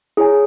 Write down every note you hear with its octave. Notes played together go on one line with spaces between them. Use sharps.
E4 G#4 C#5 G#5